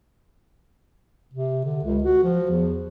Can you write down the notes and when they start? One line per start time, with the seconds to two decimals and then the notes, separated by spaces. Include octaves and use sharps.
1.34 C3
1.65 D3
1.84 C#2
2.04 F#4
2.23 F3
2.50 E2